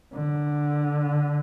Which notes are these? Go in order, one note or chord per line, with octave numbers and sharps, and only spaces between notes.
D3